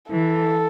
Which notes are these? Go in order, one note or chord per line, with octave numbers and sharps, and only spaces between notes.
E3 A4